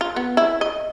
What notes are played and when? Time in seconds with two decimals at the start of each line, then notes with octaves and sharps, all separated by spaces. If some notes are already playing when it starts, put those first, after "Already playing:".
0.01 F4
0.16 B3
0.37 E4
0.61 D#5